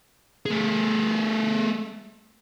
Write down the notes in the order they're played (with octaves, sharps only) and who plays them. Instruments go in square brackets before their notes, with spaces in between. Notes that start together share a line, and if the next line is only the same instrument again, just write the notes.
[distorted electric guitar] A3 G#4